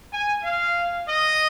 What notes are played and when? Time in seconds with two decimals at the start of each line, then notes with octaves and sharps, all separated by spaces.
0.12 G#5
0.43 F5
1.08 D#5